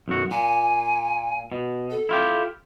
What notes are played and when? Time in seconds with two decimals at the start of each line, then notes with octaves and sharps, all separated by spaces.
0.08 B1 F#2 F#4
0.31 A#2 G#5
1.52 B2
1.90 A4
2.09 E4 F4 G4